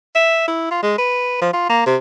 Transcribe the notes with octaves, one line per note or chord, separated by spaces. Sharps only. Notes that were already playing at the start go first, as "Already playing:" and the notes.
E5
E4
F4
G#3
B4
F3
F4
A#3
C3